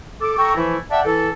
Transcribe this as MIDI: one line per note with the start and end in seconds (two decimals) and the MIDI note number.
0.22 0.35 69
0.22 0.35 86
0.38 0.57 69
0.38 0.57 79
0.38 0.57 82
0.38 0.57 85
0.57 0.78 52
0.57 0.78 53
0.57 0.78 57
0.57 0.78 64
0.91 1.02 74
0.91 1.02 76
0.91 1.02 78
0.91 1.02 79
0.91 1.02 81
1.06 1.31 52
1.06 1.31 64
1.06 1.31 69